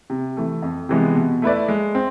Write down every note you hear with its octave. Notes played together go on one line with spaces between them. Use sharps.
C3
E3 A3
F2
C3 E3 G#3 B3
B2
A3 E4 B4 D5
G#3
C4